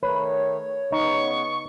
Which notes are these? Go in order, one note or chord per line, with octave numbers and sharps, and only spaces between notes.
D#3 A3 B4 C#5
C#3 B3 D#4 C#6